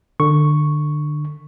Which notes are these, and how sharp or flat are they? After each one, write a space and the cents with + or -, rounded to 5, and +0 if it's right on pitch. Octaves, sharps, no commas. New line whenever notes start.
D3 +25 C#6 -5